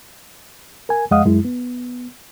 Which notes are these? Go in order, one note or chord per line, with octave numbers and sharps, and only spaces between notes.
A#4 G#5
F2 G#3 D#5 F5 F#5 D#6
F#2 G#3 E4
B3